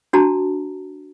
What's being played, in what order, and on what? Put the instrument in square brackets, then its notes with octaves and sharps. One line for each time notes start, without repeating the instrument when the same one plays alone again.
[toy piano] D4 F#4 A5 A#5